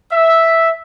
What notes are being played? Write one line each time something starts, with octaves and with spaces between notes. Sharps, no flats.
E5